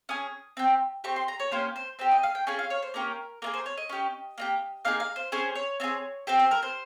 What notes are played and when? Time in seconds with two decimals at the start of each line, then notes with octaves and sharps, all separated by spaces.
0.09 C#4 G#4 D#6
0.57 C4 G4
1.04 C4 G4 C#6
1.16 C6
1.28 A#5
1.40 C#5
1.51 A#3 C#4 G4 C5
1.76 C5
1.99 C4 G4 C5
2.11 D#5
2.23 F5
2.35 G5
2.47 C#4 F4 G#4 G#5
2.59 F5
2.70 C#5
2.83 C5
2.94 A#3 C#4 G4 A#4
3.42 A#3 F4 G#4 A#4
3.54 C5
3.66 C#5
3.77 D#5
3.89 C#4 G4
4.38 A#3 D#4 G4
4.85 A#3 D#4 G#4 F5
5.00 F5
5.16 C5
5.32 C#4 G#4 C5
5.55 C#5
5.80 C4 F4
5.84 G#4
6.27 C4 G4 C5
6.39 C5
6.51 A#4
6.63 C5